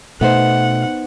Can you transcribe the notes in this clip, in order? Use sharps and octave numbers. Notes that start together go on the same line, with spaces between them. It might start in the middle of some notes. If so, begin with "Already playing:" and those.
B2 A3 B3 D#4 C5 F#5